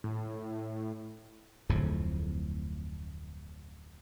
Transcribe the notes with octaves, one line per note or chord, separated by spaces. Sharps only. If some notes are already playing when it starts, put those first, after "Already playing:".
A2
D1 F2 A2